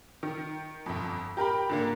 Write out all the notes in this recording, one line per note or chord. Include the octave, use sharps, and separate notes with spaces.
D#3
G1 F2
G4 A#4 G5 B5
G#2 D3 A#3